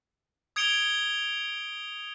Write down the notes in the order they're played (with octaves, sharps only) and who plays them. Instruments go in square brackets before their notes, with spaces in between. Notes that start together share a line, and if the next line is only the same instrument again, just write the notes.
[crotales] D#6 G#6 C#7 D7 F7 G7